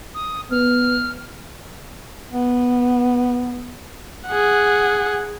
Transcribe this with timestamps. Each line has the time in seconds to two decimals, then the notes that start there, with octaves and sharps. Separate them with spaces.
0.15 D#6
0.51 B3 F6
2.31 B3
4.28 G#4 F#5